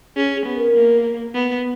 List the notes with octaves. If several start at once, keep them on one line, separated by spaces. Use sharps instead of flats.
C#4 G#4
G#4
B3
A#4
A#3
B3